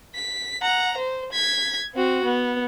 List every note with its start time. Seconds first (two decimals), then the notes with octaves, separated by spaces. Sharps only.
0.16 B6
0.62 F#5 A#5
0.97 C5
1.32 G#6 B6
1.94 C4 F#4
2.24 B3